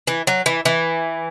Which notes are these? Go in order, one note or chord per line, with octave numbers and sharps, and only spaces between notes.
E3
F#3
E3
E3